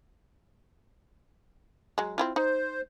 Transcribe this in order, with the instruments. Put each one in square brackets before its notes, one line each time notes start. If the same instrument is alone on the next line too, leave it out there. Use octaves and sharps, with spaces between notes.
[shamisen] F#3 G#3
C4 E4 F4
[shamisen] D#4 [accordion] C5